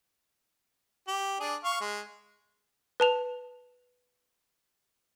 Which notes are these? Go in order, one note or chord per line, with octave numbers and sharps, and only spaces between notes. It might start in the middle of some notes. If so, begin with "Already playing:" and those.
G4
D4 G#4
F5 C#6
G#3
B4 A5 F7